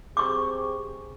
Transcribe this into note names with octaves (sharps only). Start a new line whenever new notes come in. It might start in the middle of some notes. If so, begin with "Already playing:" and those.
C3 G#4 C#6 D6